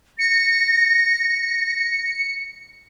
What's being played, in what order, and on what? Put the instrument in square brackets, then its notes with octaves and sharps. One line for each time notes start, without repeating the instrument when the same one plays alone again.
[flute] A#6 [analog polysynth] C#7